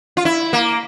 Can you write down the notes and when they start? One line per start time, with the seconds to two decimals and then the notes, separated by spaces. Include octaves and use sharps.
0.17 F4
0.25 E4
0.53 A#3